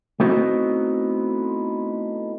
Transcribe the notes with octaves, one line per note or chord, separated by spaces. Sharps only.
A3 B3 C4 D#4 E4 F#4